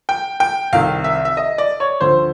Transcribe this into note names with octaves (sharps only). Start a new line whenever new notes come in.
G5
G5
C2 C3 D#3 F5
E5
E5
D#5
D5
C#5
D2 D3 F3 C5